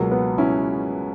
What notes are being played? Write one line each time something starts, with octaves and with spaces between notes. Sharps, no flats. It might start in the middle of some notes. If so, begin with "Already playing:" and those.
Already playing: C#2 B2 F#3 A#3
B3
C#4 E4